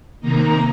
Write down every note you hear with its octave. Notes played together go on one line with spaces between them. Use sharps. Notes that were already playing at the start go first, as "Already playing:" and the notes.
C3 D#3 A#3 D#4 A#5